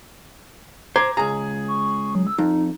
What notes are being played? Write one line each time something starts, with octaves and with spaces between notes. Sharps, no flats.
C5 A#5 D6 G#6
C#2 G#4 A#5
C#6
F#3
E6
F2 D#4